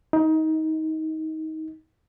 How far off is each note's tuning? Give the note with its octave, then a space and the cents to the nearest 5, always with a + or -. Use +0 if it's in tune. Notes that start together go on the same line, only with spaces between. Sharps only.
D#4 +20